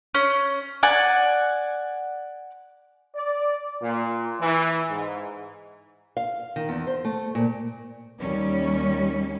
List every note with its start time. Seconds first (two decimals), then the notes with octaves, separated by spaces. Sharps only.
0.15 C#4
0.83 D5 F#5 G#5 F#6
3.16 D5
3.82 A#2
4.41 E3
4.90 G#2
6.17 F5
6.56 D#3
6.69 E2
6.87 C5
7.04 A3
7.35 A#2
8.20 D#2 G3 C#4